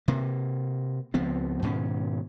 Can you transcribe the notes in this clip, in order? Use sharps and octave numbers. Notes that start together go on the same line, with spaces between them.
C3 A#3
C#2 F3 B3 C4
G#2 B2 D#3 C#4